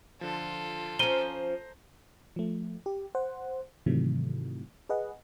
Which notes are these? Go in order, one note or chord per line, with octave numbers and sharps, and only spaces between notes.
D3 F3 F4 A4
F3 C#4 C5 A#5 D#7 G7
F3 A3
G4
C5 F#5
G#2 C3 D#3 E3 F#3 A3
G#4 B4 D#5 F#5